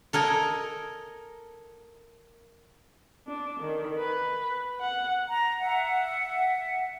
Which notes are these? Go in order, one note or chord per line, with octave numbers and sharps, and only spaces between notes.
A4 A#4 D#5 G#5
D4
D#3
B4
F#5
A#5
E5 F#5